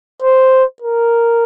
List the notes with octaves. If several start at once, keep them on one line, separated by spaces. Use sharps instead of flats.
C5
A#4